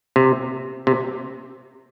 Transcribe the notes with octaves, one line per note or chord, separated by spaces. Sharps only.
C3
C3